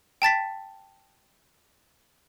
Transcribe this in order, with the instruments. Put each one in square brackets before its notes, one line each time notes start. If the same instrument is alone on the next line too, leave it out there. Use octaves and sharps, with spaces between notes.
[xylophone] G5 A5 A6 B6